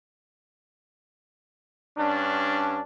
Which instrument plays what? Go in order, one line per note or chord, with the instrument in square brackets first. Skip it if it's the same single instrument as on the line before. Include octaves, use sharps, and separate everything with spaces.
[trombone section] G2 C#4 D4